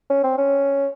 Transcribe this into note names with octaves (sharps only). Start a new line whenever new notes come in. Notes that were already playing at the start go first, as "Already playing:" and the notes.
C#4
C4
C#4